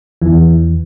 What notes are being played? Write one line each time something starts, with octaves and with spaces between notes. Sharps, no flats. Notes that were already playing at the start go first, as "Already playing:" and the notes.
E2 E3